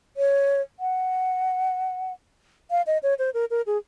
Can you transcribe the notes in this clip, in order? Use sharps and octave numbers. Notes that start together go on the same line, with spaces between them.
C#5
F#5
F5
D#5
C#5
C5
A#4
A#4
G#4